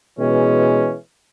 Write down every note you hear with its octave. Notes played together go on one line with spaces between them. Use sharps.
B2 E3 G#3 C#4